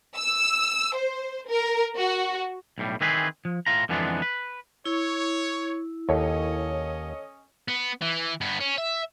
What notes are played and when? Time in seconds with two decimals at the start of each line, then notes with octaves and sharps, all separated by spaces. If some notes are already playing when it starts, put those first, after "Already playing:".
0.16 E6
0.95 C5
1.48 A#4
1.97 F#4
2.78 B1 A2 G3
3.01 D#3 E3 C4 G#4 B4
3.45 F3
3.66 A2 F4 A#5
3.89 F2 D3 E3 G#3 B3 D4
4.22 B4
4.85 E4 C#5
6.09 D#2 C#4 A4 C#5 D#5
7.68 B3
8.02 E3
8.41 G2 B3
8.60 C#4
8.78 E5